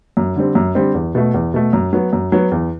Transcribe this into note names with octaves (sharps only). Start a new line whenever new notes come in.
F#2
D3 G3 C4
F#2
D3 G3 C4
E2
B2 A3
E2
B2 A3
F#2
F#3 B3
F#2
F#3 B3
E2